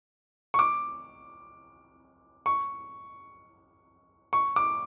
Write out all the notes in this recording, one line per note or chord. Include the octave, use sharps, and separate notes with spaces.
C#6
D6
C#6
C#6
D6